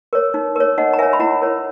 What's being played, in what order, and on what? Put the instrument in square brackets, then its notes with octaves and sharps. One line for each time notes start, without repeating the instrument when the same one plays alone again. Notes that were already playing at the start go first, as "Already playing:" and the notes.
[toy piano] A#4 C#5
D#4
A#4 C#5
D#4 D#5 F#5
A#5
A#4 E5 G#5
C#5
B5
E4 F#5 A#5
A#4 C#5